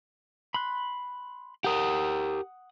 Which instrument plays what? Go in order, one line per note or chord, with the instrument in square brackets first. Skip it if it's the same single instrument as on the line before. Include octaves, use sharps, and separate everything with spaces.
[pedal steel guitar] B5 C6 F#6
[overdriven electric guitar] G4 A#4 [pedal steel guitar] F#5 D#6